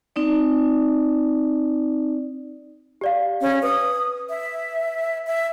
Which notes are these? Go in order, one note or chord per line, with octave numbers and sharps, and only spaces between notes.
C4 D#4 D5
G4 D5 F5
C#4
B4 D#6
E5
E5